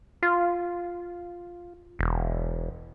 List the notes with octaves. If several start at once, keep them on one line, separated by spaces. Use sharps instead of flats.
F4
E1